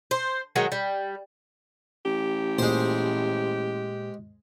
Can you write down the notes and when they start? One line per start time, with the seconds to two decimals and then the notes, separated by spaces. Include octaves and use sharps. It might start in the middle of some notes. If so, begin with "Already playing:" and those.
0.11 C5
0.56 D#3 F#3 G#3
0.72 G3
2.05 A1 G4
2.59 A#2 G#3 C5